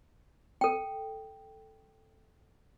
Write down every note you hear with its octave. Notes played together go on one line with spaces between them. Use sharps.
A4 G5